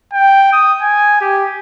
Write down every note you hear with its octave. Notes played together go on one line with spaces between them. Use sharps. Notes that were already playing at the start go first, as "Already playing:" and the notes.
G5
D#6
G#5
G4